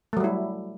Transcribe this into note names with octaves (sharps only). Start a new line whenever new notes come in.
F#3 G3 A3 E4